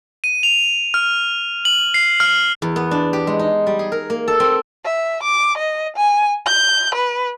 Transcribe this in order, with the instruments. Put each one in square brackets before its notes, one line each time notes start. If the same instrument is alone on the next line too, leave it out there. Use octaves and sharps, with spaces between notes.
[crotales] D#7
F7
F6
F#7
C7
F6
[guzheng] E2
B3
D4
G4
G#3
D#4
G3
G#4
A#4
A#3
A4
C4
[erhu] E5
D6
D#5
G#5
G6
B4